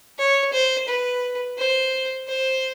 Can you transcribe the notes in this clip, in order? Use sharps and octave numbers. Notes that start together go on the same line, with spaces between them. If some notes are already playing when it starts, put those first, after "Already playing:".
C#5
C5
B4
C5
C5